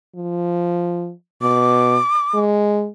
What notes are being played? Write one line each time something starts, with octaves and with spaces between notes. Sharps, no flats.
F3
B2 D6
G#3